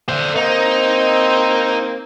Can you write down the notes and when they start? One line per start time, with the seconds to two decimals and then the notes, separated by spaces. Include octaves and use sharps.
0.09 D3 C5
0.35 A#3 C4 D#4